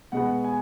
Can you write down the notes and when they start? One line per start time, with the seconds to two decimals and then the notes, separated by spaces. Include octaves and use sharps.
0.12 B2 G#3 B3 F#5
0.44 G#5